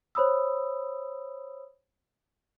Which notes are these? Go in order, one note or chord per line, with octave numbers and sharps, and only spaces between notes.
C5 C#5 B5 D#6 E6